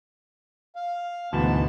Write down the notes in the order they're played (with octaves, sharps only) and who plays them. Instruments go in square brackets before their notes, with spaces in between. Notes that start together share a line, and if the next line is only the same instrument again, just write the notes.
[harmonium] F5
[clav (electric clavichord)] D2 B2 E3 [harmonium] G#2 B3 A5